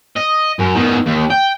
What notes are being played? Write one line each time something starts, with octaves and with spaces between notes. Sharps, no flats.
D#5
F#2
D#3 B3
D#2
G5